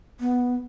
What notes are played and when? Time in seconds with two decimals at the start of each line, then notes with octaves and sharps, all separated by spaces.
0.20 B3